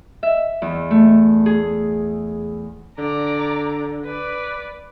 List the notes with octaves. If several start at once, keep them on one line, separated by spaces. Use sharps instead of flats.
E5
E2
A3
G#4
D3 D5 A#5
B4 D5